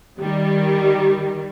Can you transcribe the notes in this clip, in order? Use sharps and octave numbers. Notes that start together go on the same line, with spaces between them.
D#3 G3